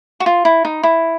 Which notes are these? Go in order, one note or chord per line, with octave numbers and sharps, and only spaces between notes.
F#4
F4
E4
D#4
E4